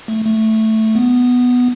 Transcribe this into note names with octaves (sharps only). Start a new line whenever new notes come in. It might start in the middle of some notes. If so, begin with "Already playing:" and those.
A3
A3
B3